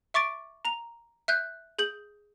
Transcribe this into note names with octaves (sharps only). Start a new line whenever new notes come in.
E5 C#6 D6 A6 D7
A#5 F7
E5 F#6 G6
G#4 G6 F#7